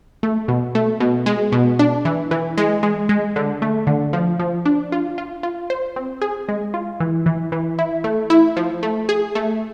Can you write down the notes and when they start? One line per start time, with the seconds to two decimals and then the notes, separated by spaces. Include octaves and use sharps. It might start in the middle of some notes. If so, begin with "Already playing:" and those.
0.23 A3
0.48 B2
0.75 A3
1.00 B2
1.26 G#3
1.52 B2
1.79 D4
2.05 E3
2.31 E3
2.58 G#3
2.83 G#3
3.09 G#3
3.36 D3
3.62 A3
3.87 D3
4.13 F3
4.40 F3
4.66 D4
4.92 F4
5.18 F4
5.43 F4
5.70 C5
5.96 C4
6.21 G#4
6.49 G#3
6.74 F4
7.00 E3
7.26 E3
7.52 E3
7.79 E4
8.04 A3
8.30 E4
8.57 F3
8.83 A3
9.09 G#4
9.35 A3